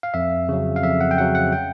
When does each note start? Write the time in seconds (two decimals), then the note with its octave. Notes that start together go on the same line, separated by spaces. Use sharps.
0.03 F5
0.14 F2 E5
0.49 C#3 F#3
0.76 F5
0.83 F2 E5
1.01 F#5
1.11 G5
1.18 C#3 F#3 F#5
1.35 F#5
1.52 G5